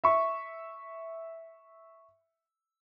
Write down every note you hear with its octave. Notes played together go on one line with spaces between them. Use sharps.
E5 C#6